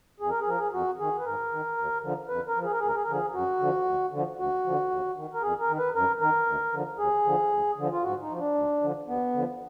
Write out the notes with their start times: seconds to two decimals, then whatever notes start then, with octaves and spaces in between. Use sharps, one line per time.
0.20 F2 G#4
0.30 A#4
0.40 G#4
0.47 F3 A#4
0.58 G#4
0.73 F2 F#4
0.99 D#3 G#4
1.19 B4
1.25 G#2 A#4
1.52 D#3
1.78 D#2
2.03 D3 F3
2.29 F2 B4
2.47 A#4
2.56 F3
2.64 G#4
2.72 A#4
2.80 D2 G#4
2.87 A#4
2.95 G#4
3.04 A#4
3.08 D3 F3 G#4
3.33 F#2 F#4
3.59 D3 F3
3.85 D2
4.12 D3 F3
4.39 D2 F#4
4.64 D3 F3
4.90 D#2
5.16 D#3
5.33 A#4
5.42 F2 G#4
5.60 A#4
5.68 D#3
5.78 B4
5.94 F#2 A#4
6.20 D#3 A#4
6.46 D2
6.72 D3 F3
6.98 D#2 G#4
7.24 D3 F3
7.51 D2
7.77 D3 F3
7.91 F4
8.03 G#2 F#4
8.21 D#4
8.30 F3
8.38 D4
8.55 D2
8.81 D3 F3
9.07 D#2 B3
9.33 D3 F3